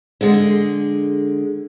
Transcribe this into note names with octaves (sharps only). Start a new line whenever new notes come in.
D3 G#3